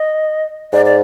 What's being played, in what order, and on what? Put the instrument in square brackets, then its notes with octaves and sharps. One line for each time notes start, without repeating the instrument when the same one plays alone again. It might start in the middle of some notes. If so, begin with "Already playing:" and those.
Already playing: [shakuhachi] D#5
[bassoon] G#2 [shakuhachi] D5
[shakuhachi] D5